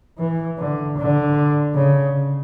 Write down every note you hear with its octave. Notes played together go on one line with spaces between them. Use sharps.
E3
D3
D3
C#3